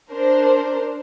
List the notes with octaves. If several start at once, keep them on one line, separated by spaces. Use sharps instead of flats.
D4 A#4 C5